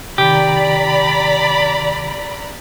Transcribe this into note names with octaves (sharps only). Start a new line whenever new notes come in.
C3 D#3 G4 D5 A#5 B5